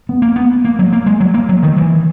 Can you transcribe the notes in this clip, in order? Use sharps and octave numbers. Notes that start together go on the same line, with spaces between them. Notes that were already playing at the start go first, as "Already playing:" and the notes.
B3
A#3
B3
A#3
F#3
A#3
G#3
F#3
A#3
F#3
D#3
E3